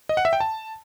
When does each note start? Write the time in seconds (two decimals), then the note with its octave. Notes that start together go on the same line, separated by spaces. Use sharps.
0.09 D#5
0.17 F#5
0.25 E5
0.33 G5
0.40 A5